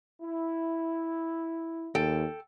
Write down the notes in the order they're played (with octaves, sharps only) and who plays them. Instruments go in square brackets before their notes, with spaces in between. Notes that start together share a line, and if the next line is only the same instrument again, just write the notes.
[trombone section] E4
[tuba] D#2 [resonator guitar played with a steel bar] A4 G5